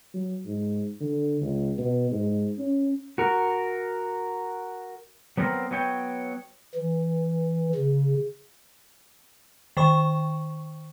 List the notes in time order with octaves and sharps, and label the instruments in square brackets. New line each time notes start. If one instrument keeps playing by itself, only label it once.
[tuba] F#3
G#2
D3
C#2
B2
G#2
C#4
[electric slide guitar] F#4 A#4
F#3 B3 C4 G#4 A#4 C5
F#3 B3 C#5 G5
[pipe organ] E3
C#3
[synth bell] D#3 C5 C#6